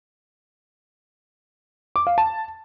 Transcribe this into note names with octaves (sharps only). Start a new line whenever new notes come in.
D6
F5
A5